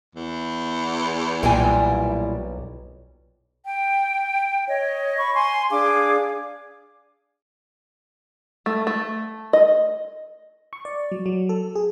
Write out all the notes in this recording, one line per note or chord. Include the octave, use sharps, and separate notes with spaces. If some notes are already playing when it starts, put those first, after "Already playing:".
E2
B1 A#2 E3 G3 G5 G#5
G5
C#5 D#5
B5 C#6
G#5 C6
D4 G#4 F5 D6
A3
A3
D#5
C#6
D5
F#3
F#3
A4
G#4